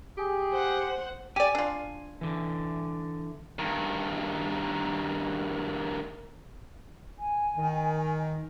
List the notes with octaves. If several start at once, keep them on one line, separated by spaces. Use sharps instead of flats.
G4 G#4
C5 F#5
G4 D5 G#5
D4 F4
D3 E3
G2 D#3
G#5
D#3